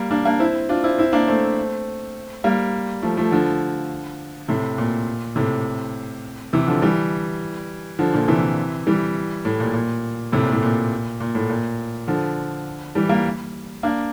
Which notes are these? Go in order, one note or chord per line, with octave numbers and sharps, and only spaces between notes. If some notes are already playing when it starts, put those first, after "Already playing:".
Already playing: G3 A#3
A#3 D4
A#3 D4
C4 E4
D4 F4
C4 E4
C4 E4
A#3 D4
A3 C4
G3 A#3
F3 A3
F3 A3
D3 F3
A2 C3
A#2
A2 C3
C3 E3
D3 F3
E3 G3
D3 F3
A#2 D3
C3 E3
E3 G3
A2
A#2
A#2
A2 C3
A#2
A2
A#2
A#2
A2
A#2
D3 F3
E3 G3
G3 A#3
A#3 D4